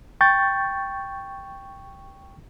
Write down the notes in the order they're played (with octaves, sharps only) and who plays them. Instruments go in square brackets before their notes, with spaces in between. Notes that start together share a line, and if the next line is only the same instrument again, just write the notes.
[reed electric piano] G5 C#6 G6 A6